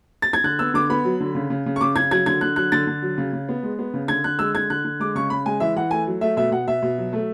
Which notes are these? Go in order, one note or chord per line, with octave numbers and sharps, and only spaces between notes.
A6
G#6
D3 F#6
B3 E6
D3 D6
B3 B5
F#3
D3
C#3
C#3
C#3
C#6
C#3 D6
C#3 G#6
F#3 G#6
D3 G#6
D3 F#6
F#3 F#6
D3 A6
D3
F#3
C#3
C#3
B3
G#3
B3
C#3
D3 G#6
D3 F#6
G#3 E6
D3 G#6
D3 F#6
D3
G#3 D6
C#3 C#6
C#3 B5
G#3 G#5
E3 E5
E3 F#5
A3 G#5
F#3
A3 E5
B2 E5
B2 F#5
B2 E5
B2
F#3
A3